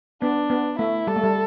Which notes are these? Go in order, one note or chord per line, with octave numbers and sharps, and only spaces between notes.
B3 D4
B3
A3 E4
G3 A4
A3
G3